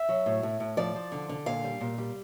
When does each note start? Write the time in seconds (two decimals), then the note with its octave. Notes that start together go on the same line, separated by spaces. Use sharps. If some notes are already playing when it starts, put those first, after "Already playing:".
Already playing: E5
0.09 F#3
0.26 A2
0.43 A2
0.60 A2
0.77 F3 D5
0.95 F3
1.12 D3
1.29 D3
1.46 A#2 F5
1.64 G3
1.81 A#2
1.98 G3